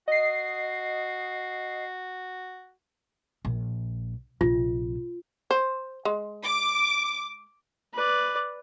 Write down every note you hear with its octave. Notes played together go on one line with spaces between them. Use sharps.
F#4 D#5 C7
A#1
A#1 C3 F4
C5
G#3
D6
B4 D5